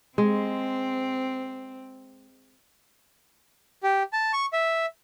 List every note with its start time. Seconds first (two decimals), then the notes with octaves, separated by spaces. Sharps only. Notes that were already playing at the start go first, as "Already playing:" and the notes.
0.18 G#3 C4
3.83 G4
4.13 A5
4.33 C#6
4.53 E5